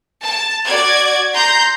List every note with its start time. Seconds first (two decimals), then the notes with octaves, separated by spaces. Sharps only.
0.22 A5
0.65 F#4 D5 G#6
1.33 A#5 C6 G6